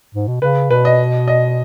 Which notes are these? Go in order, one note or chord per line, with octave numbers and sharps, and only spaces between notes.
G#2
B2
C#3 B4
B2 B4
D#5
D#5